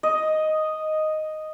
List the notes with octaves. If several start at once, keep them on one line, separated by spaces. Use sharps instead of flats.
D#5